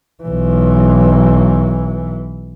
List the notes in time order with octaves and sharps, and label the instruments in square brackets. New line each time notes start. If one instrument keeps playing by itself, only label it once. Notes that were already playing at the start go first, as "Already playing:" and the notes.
[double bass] B1 E3